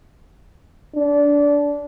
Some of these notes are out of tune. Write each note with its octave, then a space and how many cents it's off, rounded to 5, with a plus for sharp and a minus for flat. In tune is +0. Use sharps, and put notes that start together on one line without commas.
D4 -20